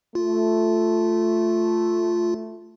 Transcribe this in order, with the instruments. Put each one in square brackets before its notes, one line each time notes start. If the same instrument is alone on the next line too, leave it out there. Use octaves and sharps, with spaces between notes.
[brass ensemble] A3 [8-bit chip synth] F4